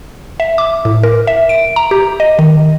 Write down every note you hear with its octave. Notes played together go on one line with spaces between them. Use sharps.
E5
D6
A2
A#4
E5
D7
A#5
G4
D#5
D#3